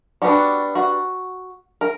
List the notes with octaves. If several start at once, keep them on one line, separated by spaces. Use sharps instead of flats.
G3 B3 D4 F#4
F#4
A#4